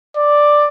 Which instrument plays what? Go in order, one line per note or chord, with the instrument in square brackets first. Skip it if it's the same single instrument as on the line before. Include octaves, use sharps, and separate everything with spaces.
[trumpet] D5